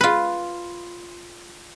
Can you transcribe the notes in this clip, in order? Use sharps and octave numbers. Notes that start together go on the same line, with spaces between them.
F4 B4